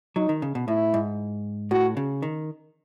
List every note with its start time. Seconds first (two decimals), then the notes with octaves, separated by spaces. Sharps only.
0.16 F#3 D#4
0.29 D#3
0.42 C#3
0.55 B2
0.68 A2 E4
0.94 G#2
1.71 A2 F#4
1.97 C#3
2.22 D#3